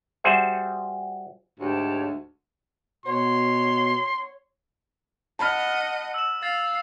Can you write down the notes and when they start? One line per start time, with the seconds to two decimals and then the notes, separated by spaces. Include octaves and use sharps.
0.24 G3 F#4 G#4 C5 E5
1.60 D2 G#2 G4 C#5 A5
3.06 B2 C#5 C6
5.39 D#5 F#5 A5 B5 F6
6.14 E6 E7
6.43 F5 A6